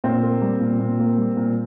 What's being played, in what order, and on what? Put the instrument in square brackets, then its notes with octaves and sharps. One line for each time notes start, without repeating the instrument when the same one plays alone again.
[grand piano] A#2 C4
A#3
G3
A#2
A#2
A#3
G3
A#2